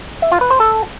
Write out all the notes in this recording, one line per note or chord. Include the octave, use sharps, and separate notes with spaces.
E5
F4
B4
C5
A4